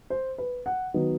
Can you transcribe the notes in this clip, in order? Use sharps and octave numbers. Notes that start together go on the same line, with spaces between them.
C5
B4
F#5
D#3 F#3 B3